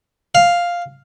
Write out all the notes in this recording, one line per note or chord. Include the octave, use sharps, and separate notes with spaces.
F5